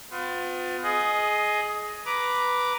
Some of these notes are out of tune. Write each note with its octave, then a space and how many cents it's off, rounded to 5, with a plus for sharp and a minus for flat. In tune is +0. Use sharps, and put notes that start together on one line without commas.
B3 +45 F4 +30
G#4 +15 D#5 +0
B4 +0 A#5 +10 D6 -5